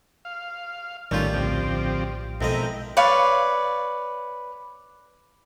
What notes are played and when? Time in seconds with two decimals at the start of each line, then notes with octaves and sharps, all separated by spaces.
0.25 F5
1.11 A#1 A2 D#3 G3 A3 C#4 F4 G6
1.34 D2 F3 C4 G4
2.41 B1 F2 G#3 E4 A#4 D#5 G5
2.97 B4 C#5 D5 F5